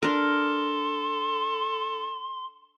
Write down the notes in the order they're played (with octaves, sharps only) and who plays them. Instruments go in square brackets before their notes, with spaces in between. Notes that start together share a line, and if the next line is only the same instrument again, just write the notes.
[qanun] D4 A#4 [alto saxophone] A4 [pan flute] C6